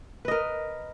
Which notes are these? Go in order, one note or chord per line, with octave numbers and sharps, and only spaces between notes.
A#4 B4 D#5